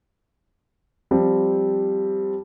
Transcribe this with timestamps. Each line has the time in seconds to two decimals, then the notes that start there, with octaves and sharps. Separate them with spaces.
1.11 F3 G3 C4